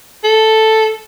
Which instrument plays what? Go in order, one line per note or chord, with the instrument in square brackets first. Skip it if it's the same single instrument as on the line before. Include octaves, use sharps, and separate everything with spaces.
[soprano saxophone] A4